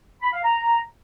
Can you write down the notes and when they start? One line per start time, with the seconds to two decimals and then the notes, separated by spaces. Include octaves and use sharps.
0.22 B5
0.33 F5
0.44 A#5